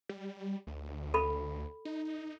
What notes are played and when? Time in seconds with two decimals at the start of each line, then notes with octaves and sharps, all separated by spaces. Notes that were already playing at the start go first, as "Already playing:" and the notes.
0.09 G3
0.67 D2
1.14 A4 B5
1.85 D#4